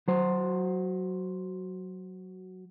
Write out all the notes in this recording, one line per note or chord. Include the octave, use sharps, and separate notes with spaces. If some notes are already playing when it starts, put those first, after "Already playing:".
F#3 F#4 C5